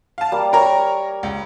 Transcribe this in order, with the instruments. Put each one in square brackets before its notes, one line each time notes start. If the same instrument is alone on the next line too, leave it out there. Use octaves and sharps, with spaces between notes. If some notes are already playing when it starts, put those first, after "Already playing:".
[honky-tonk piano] F5 A5
[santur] G3 A#3
[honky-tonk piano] A#4 C#5 A#5
C#2